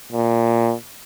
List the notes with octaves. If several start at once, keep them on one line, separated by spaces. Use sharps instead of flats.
A#2